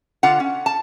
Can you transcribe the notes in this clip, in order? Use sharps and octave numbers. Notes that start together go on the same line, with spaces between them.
D3 F4 F#5
C#4
A5